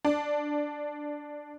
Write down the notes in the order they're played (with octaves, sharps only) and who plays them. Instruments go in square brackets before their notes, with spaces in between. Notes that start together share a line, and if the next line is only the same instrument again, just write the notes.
[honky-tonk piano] D4